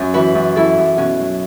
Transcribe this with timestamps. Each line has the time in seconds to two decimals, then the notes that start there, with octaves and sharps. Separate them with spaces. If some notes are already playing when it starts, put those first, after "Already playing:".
Already playing: F#2 C#4
0.14 E3 F#4 B4
0.35 F#2
0.56 E3 E4 A4
0.77 F#2
0.98 B2 C#4 F#4
1.20 F#3